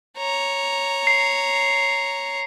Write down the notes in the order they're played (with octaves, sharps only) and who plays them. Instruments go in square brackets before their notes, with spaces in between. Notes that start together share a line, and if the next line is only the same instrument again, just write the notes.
[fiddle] C#5 A#5
[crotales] C7